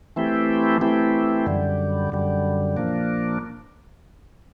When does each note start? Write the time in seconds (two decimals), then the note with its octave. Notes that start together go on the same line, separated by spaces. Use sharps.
0.16 E3 A3 C4 E4 G4
0.81 E3 A3 C4 E4 G4
1.46 F#2 D3 G3
2.12 F#2 D3 G3
2.77 A#2 F3 A#3 D4